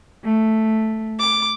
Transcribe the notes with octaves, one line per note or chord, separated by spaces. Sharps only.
A3
D6